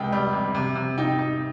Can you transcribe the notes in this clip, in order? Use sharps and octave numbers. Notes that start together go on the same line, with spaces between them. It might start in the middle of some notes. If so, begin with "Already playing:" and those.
Already playing: C#2 C3 G5
G3
C3
C3
C3
D#4 G5
D#4